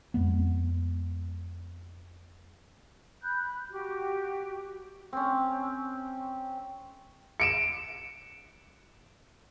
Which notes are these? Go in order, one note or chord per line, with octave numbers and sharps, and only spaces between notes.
F2 G#3 B3
B5 F#6 G6
F#4 G4
C4 C#4
C#7 D7 E7